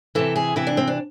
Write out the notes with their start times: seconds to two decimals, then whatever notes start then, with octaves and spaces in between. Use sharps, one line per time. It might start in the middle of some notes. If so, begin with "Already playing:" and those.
0.15 C3 E3 A4
0.36 G#4
0.56 C3 E3 E4
0.67 D4
0.77 C4
0.88 D4